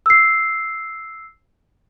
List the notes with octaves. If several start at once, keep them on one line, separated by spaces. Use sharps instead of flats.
E6 C7